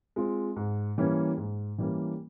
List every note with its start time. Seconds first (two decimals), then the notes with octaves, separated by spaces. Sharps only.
0.16 G#3 C4 F4
0.56 G#2
0.98 E3 G3 A#3 C#4
1.38 G#2
1.78 E3 G3 A#3 C#4